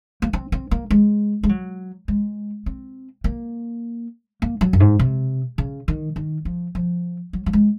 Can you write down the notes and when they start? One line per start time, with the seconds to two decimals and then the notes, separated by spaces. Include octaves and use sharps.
0.22 A#3
0.33 C4
0.52 C4
0.71 A#3
0.90 G#3
1.43 G#3
1.49 F#3
2.08 G#3
2.66 C4
3.24 A#3
4.42 A#3
4.61 F#3
4.73 F#2
4.80 G#2
4.99 C3
5.58 C#3
5.88 D#3
6.16 D#3
6.45 F3
6.75 F3
7.33 F#3
7.46 F#3
7.53 G#3